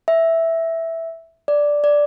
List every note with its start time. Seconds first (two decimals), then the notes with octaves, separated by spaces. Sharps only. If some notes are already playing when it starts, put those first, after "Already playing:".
0.08 E5
1.48 D5
1.84 D5